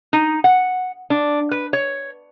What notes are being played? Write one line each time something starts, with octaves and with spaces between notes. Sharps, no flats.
D#4
F#5
D4
B4
C#5